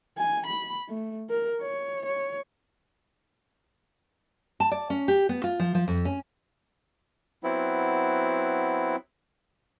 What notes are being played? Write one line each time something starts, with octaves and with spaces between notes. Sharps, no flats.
G#5
B5
A3
A#4
C#5
C#5
A5
D5
C#4
G4
B3
F4
F3
F3
F2
C#4
F#3 B3 C4 E4